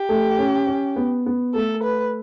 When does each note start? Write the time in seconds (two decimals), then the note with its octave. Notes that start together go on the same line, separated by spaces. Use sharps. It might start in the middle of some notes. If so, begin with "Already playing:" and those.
Already playing: G4
0.09 A3
0.38 C#4
0.67 C#4
0.96 B3
1.26 B3
1.54 A3 A4
1.83 B4